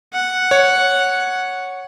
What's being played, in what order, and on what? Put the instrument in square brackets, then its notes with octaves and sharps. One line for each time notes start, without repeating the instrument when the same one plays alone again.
[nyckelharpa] F#5
[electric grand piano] C#5